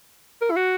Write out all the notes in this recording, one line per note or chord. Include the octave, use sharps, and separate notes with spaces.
A#4
E4
F#4